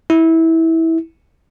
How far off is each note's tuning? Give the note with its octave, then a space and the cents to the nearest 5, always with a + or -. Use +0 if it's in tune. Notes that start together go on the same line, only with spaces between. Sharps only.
E4 -20